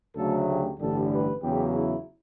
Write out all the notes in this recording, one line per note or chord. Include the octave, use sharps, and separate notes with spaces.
D2 C#3 F#3 A3 A4
G4
A1 G2 D3 G3 A4
B4
E2 C#3 F#3 G4
E4